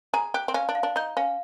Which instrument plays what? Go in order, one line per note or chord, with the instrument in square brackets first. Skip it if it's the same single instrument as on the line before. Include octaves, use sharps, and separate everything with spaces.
[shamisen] G#4 [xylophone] A#5
[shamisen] G4 [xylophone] F#6
[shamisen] C4
[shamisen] C#4 [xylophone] F5
[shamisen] D4
[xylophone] F5
[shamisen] D4
[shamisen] D#4 [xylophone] G6
[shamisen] C#4 [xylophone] F5